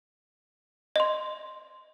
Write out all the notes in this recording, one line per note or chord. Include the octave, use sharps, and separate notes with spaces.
D#5 C6